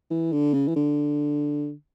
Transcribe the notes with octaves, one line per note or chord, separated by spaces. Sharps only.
E3
D3
C#3
E3
D3